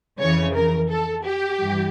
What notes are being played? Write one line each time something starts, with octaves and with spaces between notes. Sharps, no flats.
F2 C#3 E3 C#5
A#4
A4
G4
G2 E3